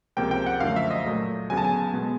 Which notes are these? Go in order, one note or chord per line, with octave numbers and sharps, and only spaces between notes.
C#2 C3 F3 A#3 G5
G5
F#5
F#2 D3 F3 A3 F5
E5
D#5
A#2 F#3 A3
D2 C#3 F#3 B3 G#5
A5
G#5
B2 G#3 B3